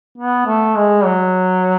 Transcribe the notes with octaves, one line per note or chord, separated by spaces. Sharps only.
B3
A3
G#3
F#3